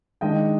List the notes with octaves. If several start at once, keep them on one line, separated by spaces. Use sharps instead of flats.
D#3 G#3 D4 D#5 G5